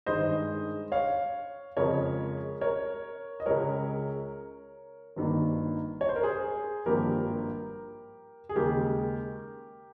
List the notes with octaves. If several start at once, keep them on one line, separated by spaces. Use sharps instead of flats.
G2 D#3 G#3 C5 D#5
C#5 F5
F2 C#3 F3 G#3 A#4 C#5
A#4 C#5
D#5
C#2 C#3 G#3 A#4 C#5
G#1 G2 D#3 A#3
C#5
C5
A#4
G#4 C5
G#1 G2 F3 A#3 G4 A#4
G#4
D#2 C#3 G#3 G4 A#4